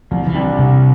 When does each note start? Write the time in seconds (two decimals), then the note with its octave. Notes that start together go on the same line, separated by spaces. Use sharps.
0.11 C2 F3
0.27 E3
0.34 C3 G3 D4
0.58 C2 C3